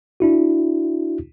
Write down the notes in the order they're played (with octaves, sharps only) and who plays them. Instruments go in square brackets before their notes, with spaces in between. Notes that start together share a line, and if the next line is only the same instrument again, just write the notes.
[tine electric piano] D4 E4 F#4